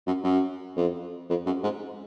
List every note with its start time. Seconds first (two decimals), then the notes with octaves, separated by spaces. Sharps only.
0.06 F#2
0.24 F#2
0.76 F2
1.29 F2
1.46 F#2
1.63 G#2